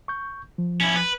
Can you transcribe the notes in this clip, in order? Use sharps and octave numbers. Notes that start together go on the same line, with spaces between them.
C#6 G6
F3
C#4 E4
B4